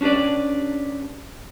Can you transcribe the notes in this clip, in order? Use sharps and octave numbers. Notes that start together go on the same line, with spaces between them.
C#4 D4 G4 B4 D5